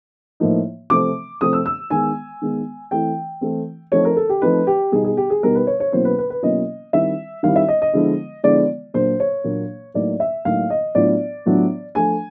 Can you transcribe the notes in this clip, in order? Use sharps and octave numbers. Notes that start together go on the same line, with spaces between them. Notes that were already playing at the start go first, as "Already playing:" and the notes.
A2 F3 A#3 D#4
C3 F3 A3 C4 D6
C3 F3 A3 C4 D#6
E6
E6
D#3 G#3 B3 G#5
D#3 G#3 B3
E3 A3 C4 E4 G5
E3 A3 C4 E4
F3 A3 C4 D#4 C#5
A#4
A4
G4
F3 A3 C4 D#4 B4
G4
B2 G3 B3 D#4 G#4
G#4
G4
G#4
B2 G3 B3 D#4 A#4
B4
C#5
C#5
B2 F#3 A#3 C#4 E4 C5
B4
B4
B4
B2 F#3 A#3 C#4 E4 D#5
D#3 G3 C4 E4 E5
D#3 G3 C4 E4 F5
E5
D#5
D#5
D3 F3 G#3 B3 E4
D3 F3 G#3 B3 E4 D5
A#2 F#3 A#3 D4 C5
C#5
A#2 F#3 A#3 D4
A2 F#3 A#3 D#4 D5
E5
A2 F#3 A#3 D#4 F5
D#5
A2 F#3 B3 D4 F4 D5
A2 F#3 B3 D4 F4
F3 A3 D4 G#5